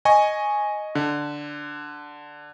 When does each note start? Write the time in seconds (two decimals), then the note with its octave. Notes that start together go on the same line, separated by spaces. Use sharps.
0.05 D#5 G#5 C#6
0.95 D3